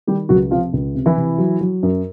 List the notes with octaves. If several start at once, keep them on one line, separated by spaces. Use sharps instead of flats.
D#3 G3 G4
C#2 F#3 F#4
C3 F3 F4
C#2
C3
E3 E4
C3
F#3
F#3
F#2